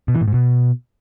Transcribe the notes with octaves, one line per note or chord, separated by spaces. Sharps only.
B2
E3
A2
G#2
B2